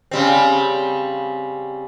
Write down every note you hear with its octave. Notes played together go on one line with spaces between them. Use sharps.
C#3 G3 C4